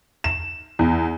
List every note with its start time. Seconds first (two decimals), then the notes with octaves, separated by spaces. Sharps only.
0.24 E7
0.79 E2